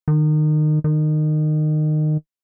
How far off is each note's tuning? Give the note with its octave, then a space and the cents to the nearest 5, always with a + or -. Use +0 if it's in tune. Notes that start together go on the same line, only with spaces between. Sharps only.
D#3 -30
D#3 -25